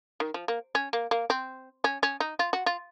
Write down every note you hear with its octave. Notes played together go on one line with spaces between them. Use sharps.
D#3
F3
A#3
C#4
A#3
A#3
C4
C#4
C#4
D#4
F4
F#4
F4